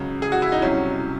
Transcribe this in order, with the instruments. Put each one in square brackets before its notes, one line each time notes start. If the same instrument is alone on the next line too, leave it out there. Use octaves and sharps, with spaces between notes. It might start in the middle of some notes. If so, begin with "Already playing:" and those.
Already playing: [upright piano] C#2 C#3 F#3
G#4
F#4
E4
D#4
C2 C3 F#3 C#4